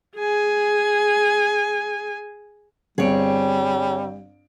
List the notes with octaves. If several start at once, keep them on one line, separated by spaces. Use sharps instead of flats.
G#4 G#5
G1 G3 C4 G#4 C#5 D7